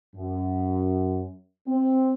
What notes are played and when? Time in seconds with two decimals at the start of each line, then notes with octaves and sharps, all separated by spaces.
0.16 F#2
1.68 C4